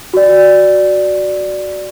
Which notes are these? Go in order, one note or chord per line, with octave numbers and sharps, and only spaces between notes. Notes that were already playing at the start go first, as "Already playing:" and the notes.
F#4 D5